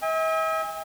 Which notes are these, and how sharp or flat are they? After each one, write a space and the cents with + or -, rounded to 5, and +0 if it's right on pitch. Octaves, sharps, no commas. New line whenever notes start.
E5 -45 G#5 -45